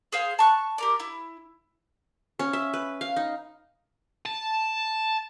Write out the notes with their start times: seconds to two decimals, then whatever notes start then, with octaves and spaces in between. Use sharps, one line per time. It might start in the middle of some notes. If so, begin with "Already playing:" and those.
0.12 G#4 C5 F5
0.39 A5 C#6 F#6
0.78 G4 A#4 D5
1.00 E4
2.39 C#4
2.53 E5
2.73 B4
3.01 F5
3.16 D#4
4.26 A5